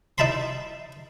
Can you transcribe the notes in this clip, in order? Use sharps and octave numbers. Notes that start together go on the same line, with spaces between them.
D#4 E4 A5 B5 C6